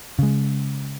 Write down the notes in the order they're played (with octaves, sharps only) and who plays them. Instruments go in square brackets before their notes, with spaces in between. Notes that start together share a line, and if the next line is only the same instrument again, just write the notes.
[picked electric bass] C#3 G#3